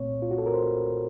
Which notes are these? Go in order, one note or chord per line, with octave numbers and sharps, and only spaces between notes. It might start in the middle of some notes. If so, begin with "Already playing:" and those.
Already playing: C2 A#2 A3 C4 C#5
F4
F#4
A4
A#4
C5